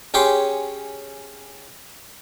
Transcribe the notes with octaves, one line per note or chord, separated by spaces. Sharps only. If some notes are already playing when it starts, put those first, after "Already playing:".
C#4 G4 G#4 C#5 G5 C6